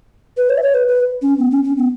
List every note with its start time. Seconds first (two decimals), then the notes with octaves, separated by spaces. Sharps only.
0.37 B4
0.50 C#5
0.58 E5
0.63 C#5
0.74 B4
0.88 B4
1.22 C#4
1.39 B3
1.51 C#4
1.64 C#4
1.77 B3